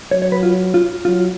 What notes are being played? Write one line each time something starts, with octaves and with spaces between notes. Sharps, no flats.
F#3 C#5
C#5
B4
F4
F4
F#3 F4